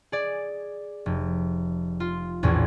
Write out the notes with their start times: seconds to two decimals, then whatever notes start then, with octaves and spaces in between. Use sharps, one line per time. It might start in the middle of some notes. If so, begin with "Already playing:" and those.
0.12 G#4 D5
1.06 F1
2.00 F4
2.43 A#1 E2 A2 C#4